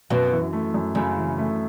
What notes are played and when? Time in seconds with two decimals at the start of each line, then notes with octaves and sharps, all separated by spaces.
0.10 F#2 B2
0.31 E3
0.53 A3
0.74 F#2
0.95 F#2 C#3
1.17 E3
1.38 A3